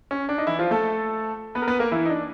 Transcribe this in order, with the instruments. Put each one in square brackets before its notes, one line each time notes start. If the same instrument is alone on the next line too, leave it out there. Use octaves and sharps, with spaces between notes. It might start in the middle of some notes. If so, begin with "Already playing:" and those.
[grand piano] C#4
D4
D#4
E3 E4
F3 F4
A3 A4
B3 B4
A#4
B3 B4
A#3 A#4
E3 E4
D#4
D4